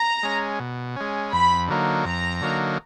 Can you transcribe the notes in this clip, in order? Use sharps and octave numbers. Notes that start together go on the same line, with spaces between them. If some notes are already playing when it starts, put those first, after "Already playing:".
Already playing: A#5
G#3 C#4
B2
G#3 C#4
F2 B5
D3 F#3 A#3 D#4
F2 A#5
D3 F#3 A#3 D#4